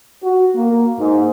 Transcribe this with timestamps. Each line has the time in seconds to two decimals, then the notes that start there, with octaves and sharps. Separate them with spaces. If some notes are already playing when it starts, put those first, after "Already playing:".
0.23 F#4
0.55 A#3
1.00 G#2